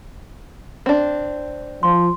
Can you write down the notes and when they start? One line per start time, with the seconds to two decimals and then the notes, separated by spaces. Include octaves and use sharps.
0.86 C4 D4
1.83 F3 C6